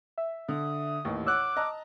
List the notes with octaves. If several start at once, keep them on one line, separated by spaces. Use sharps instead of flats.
E5
D3 D#6
A1 D#2 A2
C#5 F#5 D6 E6 F#6
D#5 A5 A#5